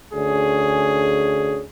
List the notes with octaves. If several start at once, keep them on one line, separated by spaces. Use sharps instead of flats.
D2 C#4 G#4